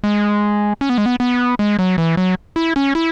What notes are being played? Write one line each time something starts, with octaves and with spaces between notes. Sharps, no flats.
G#3
C#4
B3
G#3
B3
B3
G#3
F#3
E3
F#3
E4
C#4
E4